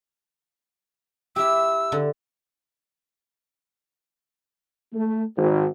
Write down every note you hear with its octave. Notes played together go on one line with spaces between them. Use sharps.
E4 G4 E6
D3
A3
G#1